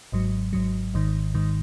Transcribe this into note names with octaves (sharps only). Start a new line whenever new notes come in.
G#1 G#2 F#3
G#1 G#2 F#3
G#1 G#2 D#3
G#1 G#2 D#3